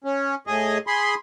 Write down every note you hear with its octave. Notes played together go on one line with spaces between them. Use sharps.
C#4
A2 G#4 D#5
G#4 B5 C6